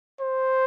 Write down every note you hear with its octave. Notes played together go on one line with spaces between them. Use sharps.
C5